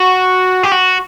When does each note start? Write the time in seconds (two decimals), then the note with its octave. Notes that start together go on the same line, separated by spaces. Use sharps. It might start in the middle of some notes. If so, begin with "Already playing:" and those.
Already playing: F#4
0.63 G4
0.72 F#4